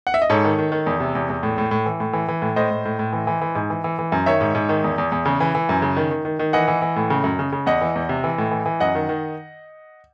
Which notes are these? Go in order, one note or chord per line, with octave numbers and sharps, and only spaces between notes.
F#5
E5
D#5
G#2 A4 C#5
D#3
D#3
D#3
E2
C3
E2
E2
A2
A2
A2
E3
A2
E3
E3
A2
A2 C5 D#5
A2
A2
A2
E3
E3
E3
G#2
E3
E3
E3
F#2
D#3 C#5 E5
G#2
G#2
D#3
E2
E2
E2
C#3
E3
E3
F#2
C#3
D#3
D#3
D#3
D#3
E3 D#5 F#5
E3
E3
A2
C#3
F#2
C#3
C#3
E2 D#5 F#5
E3
E2
C3
E3
A2
E3
E3
F#2 D#5 F#5
D#3
D#3